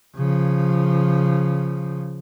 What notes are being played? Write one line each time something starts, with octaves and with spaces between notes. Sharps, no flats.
C#3 F3